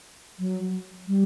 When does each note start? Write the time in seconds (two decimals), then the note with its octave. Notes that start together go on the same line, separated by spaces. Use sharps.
0.39 F#3
1.08 G3